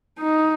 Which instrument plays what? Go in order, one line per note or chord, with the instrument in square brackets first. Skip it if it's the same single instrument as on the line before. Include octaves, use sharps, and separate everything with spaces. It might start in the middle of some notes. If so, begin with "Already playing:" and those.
[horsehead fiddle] D#4